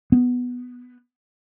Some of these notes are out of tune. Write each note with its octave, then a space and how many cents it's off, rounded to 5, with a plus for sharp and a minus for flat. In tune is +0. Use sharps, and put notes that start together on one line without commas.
B3 +0